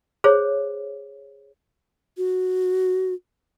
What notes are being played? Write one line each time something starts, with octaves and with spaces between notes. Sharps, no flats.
G#4 C5 C#5
F#4